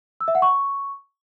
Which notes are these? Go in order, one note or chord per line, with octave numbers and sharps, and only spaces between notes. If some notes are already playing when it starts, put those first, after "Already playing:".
E6
E5
F#5
C#6